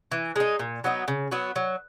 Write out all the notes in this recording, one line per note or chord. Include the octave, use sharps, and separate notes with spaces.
E3
G#3 D#4
A#2
F#3 B3 D#4
C#3
F#3 B3 F#4
F#3